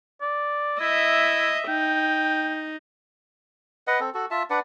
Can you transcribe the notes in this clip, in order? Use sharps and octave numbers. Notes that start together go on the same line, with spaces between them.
D5
E4 D#5 E5
D#4 G5
B4 D#5 F#5
C4 A4
F#4 A4
F4 E5 A5
D4 B4 D5 F#5